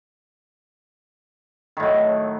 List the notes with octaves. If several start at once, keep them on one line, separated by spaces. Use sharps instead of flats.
A2 D#3 F#3